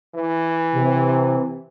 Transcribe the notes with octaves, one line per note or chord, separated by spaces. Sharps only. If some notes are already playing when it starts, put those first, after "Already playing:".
E3
C3